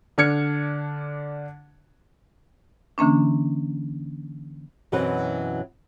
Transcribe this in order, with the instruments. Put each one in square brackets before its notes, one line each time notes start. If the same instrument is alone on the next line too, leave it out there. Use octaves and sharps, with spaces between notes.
[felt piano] D3 D4 F6 G#6 C#7
[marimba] D3 E3 A#3 C#4 D4
[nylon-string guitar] F#2 B2 E3 F#3 C4 B4